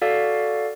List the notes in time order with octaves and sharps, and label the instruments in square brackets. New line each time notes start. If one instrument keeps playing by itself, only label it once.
[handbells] F#4 A4 D5 F5